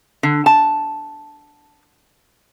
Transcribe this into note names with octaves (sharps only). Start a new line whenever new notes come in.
D3
A5